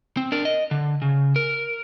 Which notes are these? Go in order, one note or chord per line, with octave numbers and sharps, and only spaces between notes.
C4
D4 A#4
D#5
D3
C#3
A#4